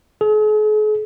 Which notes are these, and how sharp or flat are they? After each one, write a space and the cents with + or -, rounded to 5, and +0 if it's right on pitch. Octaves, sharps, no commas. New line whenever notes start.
G#4 +45